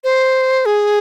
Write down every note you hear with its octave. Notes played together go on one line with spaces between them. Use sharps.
C5
G#4